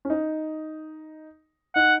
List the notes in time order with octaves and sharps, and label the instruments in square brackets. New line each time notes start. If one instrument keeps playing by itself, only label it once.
[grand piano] C#4
D#4
[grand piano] D#4 [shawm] F#5